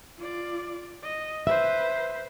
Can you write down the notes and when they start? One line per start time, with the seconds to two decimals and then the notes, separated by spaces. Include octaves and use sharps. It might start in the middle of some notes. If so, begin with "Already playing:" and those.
0.19 F4 D5
1.03 D#5
1.47 B4 C5 E5